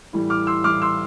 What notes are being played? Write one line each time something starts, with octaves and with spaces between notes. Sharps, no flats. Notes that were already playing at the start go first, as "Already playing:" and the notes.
A2 E3 G3
D6 F6
C6 E6
A2 E3 G3 D6 F6
C6 E6